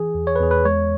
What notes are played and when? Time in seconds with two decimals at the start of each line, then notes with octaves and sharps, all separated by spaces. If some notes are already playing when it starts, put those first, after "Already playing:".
Already playing: E3 G#4
0.15 E2
0.27 C#5
0.36 B4
0.40 E2 G#4
0.51 B4
0.65 G#3 C#5